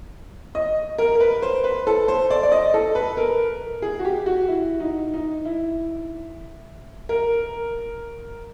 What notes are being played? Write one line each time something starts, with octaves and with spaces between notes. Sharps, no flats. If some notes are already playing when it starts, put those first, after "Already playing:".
D#5
A#4
A#4
B4
C5
B4
A4
C5
D5
D5
D#5
A4
B4
A#4
G#4
F#4
G4
F#4
E4
D#4
D#4
E4
A#4